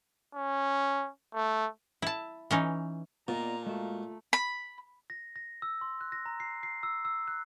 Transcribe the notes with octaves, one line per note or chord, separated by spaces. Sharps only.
C#4
A3
E4 A5
E3 C#4 D#4
A#2 B3 F4 D5 D#5 A#5
G#3 A3 F#4
B5
A#6
A#6
E6
C6
F#6
A#6
A#5
C7
C7
E6
E6
F#6